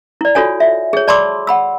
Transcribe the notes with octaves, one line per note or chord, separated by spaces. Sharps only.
E4 D5
F4 F#4 A4 C#5 G#5
E5
G#4 C#5
D5 A5 B5 C6 D6 E6
F#5 B5 E6